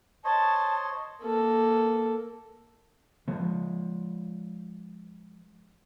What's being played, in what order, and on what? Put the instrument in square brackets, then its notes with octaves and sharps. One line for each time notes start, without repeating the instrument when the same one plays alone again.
[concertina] C5 C#5 D#5 [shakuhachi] A5
[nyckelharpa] A#3 A4
[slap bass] F3 G#3